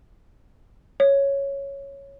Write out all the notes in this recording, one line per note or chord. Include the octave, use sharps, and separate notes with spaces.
C#5